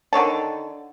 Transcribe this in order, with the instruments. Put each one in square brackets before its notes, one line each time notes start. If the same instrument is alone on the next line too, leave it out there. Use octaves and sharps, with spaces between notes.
[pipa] D3 D#3 C#5 A5